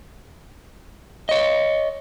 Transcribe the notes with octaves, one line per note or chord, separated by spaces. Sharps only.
C#5 D#5